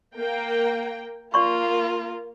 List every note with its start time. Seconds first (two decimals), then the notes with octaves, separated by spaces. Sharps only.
0.15 A#3 G5
1.34 A#3 F4 D5 C6 C#6